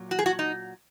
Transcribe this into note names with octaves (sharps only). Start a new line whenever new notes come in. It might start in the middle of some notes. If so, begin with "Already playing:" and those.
Already playing: A#2 F#3
F#4
G#4
F#4
D#4